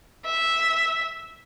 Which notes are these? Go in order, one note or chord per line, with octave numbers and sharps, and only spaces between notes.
E5